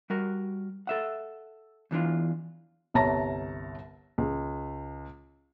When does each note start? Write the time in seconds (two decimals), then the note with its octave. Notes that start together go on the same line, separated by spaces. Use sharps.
0.10 G3 F#4 A#4
0.87 A4 E5 F#5
1.91 E2 E3 D4 F4
2.94 G1 C2 C#5 A5 A#5 A#6
4.18 C#2